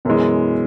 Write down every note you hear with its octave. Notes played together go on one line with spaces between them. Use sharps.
F#2 B2 E3 G#3